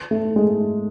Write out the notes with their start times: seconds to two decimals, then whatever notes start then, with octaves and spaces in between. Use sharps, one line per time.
0.11 A3
0.36 G#3